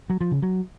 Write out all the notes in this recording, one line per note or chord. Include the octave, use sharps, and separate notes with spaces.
F#3
F3
C#3
F#3